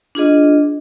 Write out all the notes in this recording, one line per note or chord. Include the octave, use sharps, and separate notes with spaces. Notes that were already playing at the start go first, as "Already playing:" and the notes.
D4 F4 G#4 D#5